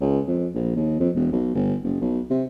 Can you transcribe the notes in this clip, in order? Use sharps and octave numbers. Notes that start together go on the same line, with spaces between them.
C#2
F2
A#1
D#2
F2
E1
B1
G1
F#1
B1
C3